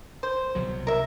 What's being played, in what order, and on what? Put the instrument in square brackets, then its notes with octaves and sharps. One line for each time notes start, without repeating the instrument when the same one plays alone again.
[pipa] C5
[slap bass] C2 B2 F#3
[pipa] A#4 E5